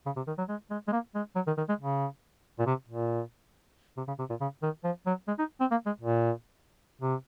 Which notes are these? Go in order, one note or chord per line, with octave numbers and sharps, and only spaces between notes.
C#3
C3
D#3
F#3
G#3
G#3
G#3
A#3
G#3
F#3
D#3
D#3
G#3
C#3
A#2
C3
A#2
C3
C#3
C3
A#2
C#3
D#3
F3
F#3
G#3
D#4
C4
A#3
G#3
A#2
C3